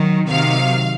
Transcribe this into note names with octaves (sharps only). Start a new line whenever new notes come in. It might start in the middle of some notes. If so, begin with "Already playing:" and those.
Already playing: D#3 F#3
C3 D#3 F#3 F5